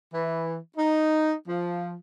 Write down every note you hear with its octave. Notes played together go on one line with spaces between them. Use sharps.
E3
D#4
F3